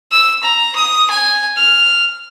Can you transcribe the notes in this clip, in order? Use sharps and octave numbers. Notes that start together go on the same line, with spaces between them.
E6
A#5
D#6
G#5
F6